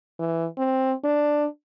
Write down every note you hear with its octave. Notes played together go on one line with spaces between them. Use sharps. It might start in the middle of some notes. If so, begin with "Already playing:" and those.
E3
C4
D4